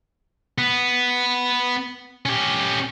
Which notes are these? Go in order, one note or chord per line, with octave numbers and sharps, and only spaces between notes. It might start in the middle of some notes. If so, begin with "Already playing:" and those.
B3
C#4 G4